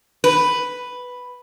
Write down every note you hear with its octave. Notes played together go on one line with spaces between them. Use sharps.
B4